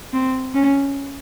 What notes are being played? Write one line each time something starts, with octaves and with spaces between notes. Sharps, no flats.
C4
C#4